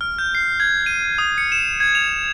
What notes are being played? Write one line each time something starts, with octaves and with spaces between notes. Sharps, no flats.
F6
G6
C7
G#6
D#7
D#6
C#7
E7
G#6
F7